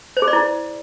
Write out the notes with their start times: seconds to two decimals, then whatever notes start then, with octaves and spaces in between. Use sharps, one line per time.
0.17 C5
0.22 G#4
0.28 D5
0.33 E4